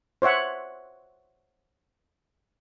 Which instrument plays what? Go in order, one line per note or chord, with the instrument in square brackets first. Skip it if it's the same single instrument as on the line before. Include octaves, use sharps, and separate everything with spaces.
[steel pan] C5 C#5 E5 F#5